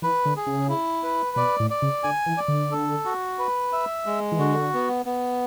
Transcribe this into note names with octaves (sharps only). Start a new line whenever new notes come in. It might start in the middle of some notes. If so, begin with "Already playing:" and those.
E3 B4
D3
G#4
C#3
E4
B4
B2 D5
A2
D5
C#3
D3 G#5
E3
D5
D3
A4
F#4
B4
E5
G#3
E3
D3 F#4
B3
B3